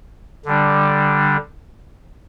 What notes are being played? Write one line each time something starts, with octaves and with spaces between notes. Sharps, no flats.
D3 G3 D4